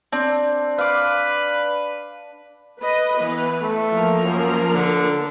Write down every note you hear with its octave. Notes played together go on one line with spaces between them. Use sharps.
C4 D4
B4 D5 F5
B4 D#5
E3 B3 B4
A3
F3 A#3 A#4
F#2
D3